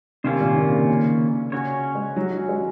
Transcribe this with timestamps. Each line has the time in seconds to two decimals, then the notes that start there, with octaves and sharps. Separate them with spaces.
0.24 C3 D#3 A#3 C#4 F4 C5
0.40 A#2
0.57 A#2
0.72 C#3
1.52 C#3 C#4 F#4 C#5
1.95 G#3
2.16 F#3
2.32 F#3
2.49 G#3